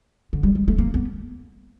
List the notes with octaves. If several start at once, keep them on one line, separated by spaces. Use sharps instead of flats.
D3
G3
G#3
A3
A#3
B3